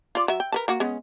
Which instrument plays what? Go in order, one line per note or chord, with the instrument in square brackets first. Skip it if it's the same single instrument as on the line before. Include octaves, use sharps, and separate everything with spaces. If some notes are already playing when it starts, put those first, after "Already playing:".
[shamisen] F4 D5
F#3 E5
G5
A#4 B4 A5
A#3 F#4
G#3 B3 C#4